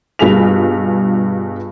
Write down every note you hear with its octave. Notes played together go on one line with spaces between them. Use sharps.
G2 B2 F4 G#4 B6 F7